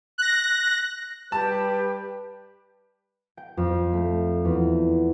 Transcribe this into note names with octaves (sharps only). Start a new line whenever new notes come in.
F#6 A#6
G3 G4 B4 A5
G5
F2
A3
E2